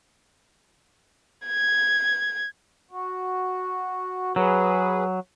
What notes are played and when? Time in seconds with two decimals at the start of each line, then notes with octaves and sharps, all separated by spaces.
1.46 G#6
2.91 F#4
4.36 F#3 G#4 B4